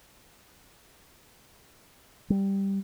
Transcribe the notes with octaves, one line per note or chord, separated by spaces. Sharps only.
G3